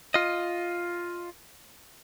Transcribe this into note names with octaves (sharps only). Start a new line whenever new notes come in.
F4 D#5